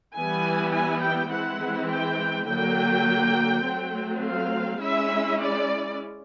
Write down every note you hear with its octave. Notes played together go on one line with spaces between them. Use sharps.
E3 G3 B3 E4 G#5
G#5
G5
E3 G#3 C4 E4 F#5
G5
D3 F#3 A#3 G5
F#3 A3 C4
F5
G#3 C#4 E4 E5
D5